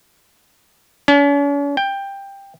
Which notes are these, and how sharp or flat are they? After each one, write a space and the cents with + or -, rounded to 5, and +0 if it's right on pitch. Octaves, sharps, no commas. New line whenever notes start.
C#4 +45
G5 +10